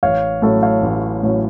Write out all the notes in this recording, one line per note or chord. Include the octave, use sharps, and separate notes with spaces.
A1 C#5 F5
A2 F#3 C#4 A4 C#5
C#5 F5
A1
A2 F#3 C#4